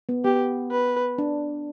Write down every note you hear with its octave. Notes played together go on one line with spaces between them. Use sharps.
B3
B3 G4
B4
D4